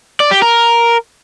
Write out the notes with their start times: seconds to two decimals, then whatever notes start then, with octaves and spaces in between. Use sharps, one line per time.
0.20 D5
0.31 G4
0.42 A#4